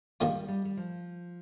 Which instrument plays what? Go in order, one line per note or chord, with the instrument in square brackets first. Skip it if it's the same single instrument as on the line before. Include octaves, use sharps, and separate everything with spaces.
[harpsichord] G2 D#3 A#3 F4 [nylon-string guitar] G3
[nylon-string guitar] G3
G3
F3